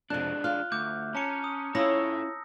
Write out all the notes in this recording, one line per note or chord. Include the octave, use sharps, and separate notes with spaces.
F2 C3 G#3 D4 F#6
F4 F6 F#6
D2 D6 G6
C#4 A5 A#5 C#7
D#6
C#4 E4 F4 A4 C#5 D#6 E6 A#6